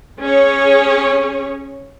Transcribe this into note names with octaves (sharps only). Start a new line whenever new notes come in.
C#4 G#4 C#5